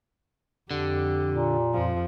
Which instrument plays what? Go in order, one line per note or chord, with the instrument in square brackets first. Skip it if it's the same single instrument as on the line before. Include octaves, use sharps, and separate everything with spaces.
[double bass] F2 [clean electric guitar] D3 [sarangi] G4
[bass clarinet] A#2
[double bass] F2 [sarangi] F3